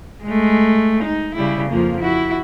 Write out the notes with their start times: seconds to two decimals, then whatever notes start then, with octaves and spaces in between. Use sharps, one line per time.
0.24 G#3 A3
1.04 D#4
1.36 C#3 G3 E4
1.69 F2 F3 A#3
2.00 E4 F#4